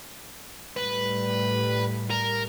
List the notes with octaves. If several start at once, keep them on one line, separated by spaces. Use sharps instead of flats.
A2 G3 B4
A#4